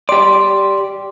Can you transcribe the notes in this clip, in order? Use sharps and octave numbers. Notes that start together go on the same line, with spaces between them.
G4 D5 C6